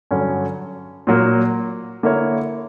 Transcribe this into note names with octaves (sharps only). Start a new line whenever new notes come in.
G2 D3 F#3 C#4
A#2 F#3 A#3
D3 A#3 E4 A#4 C#5